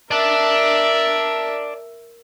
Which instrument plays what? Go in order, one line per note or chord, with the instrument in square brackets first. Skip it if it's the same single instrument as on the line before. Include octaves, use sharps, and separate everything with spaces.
[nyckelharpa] A#4 E5 [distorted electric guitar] D5 A5